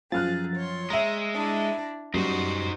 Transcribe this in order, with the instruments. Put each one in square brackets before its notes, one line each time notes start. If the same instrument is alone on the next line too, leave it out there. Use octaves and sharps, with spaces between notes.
[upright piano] F#2 F6 F#6 [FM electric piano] F3 A6 [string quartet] G#4
[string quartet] C#5 C6
[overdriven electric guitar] G#3 [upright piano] E5 A#5 [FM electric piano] A#6
[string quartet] D4 E4
[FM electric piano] F#2 [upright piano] G3 C7 [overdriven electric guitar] D#4 C5 [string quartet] F#4